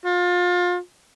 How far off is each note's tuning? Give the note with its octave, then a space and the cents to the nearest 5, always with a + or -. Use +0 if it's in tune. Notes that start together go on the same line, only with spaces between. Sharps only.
F4 +30